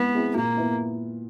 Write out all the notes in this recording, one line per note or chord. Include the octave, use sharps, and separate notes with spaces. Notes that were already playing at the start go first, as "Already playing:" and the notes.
Already playing: G#3 B3 C4 E4 G#4
C4 E4 G#4
A#2 A#3
B3 E4